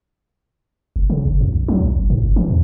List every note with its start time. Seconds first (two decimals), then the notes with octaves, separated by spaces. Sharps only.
0.96 F1
1.10 C#3
1.26 G1
1.41 F2
1.53 A#1
1.68 F#3
1.80 C2
1.96 G1
2.10 G#2
2.23 F#1
2.36 E3
2.50 E2